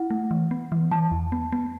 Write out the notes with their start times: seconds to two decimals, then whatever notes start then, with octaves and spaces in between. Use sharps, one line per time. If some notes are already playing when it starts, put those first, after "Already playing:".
Already playing: E4 F#5
0.10 A3
0.31 E3
0.51 B3
0.72 E3
0.91 E3 A5
1.11 E2
1.32 B3
1.52 B3